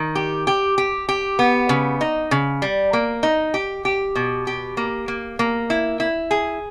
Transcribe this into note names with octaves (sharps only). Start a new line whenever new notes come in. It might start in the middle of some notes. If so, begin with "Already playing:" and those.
Already playing: D#3
G4
G4
G4
G4
B3
C#3
D#4
C#3
G3
A#3
D#4
G4
G4
B2
G4
A#3
A#3
A#3
E4
E4
G#4